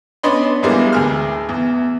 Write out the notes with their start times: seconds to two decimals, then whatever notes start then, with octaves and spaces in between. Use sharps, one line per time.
0.23 B3 C#4 D4 D#5 B5 C6
0.63 E2 A2 G3 G#3 A#3 B3
0.92 D2 G#4 F6
1.49 E2